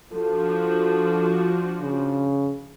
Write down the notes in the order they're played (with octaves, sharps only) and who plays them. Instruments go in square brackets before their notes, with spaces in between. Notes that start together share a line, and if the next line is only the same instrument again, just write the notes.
[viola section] F3 D4 F#4 [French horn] A4
[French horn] C#3